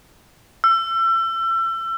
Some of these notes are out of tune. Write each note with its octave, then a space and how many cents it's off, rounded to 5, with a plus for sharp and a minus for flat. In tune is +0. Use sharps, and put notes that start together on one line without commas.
E6 +35